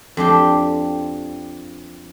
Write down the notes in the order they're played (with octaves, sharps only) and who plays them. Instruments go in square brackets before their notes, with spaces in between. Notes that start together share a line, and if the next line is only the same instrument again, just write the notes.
[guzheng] F2 D4 G4 C6